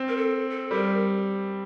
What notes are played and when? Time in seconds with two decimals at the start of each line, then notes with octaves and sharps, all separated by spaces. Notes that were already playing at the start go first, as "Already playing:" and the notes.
Already playing: C4
0.08 A#4
0.17 A4
0.50 A4
0.71 G3 A#4